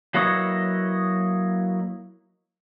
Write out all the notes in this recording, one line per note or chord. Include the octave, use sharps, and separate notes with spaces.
F#3 A#3 E4 B4 C#5 D#5